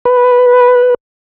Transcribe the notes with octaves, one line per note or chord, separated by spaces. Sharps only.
B4